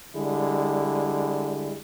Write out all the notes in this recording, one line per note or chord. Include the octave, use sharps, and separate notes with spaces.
D3 G3 G#3 E4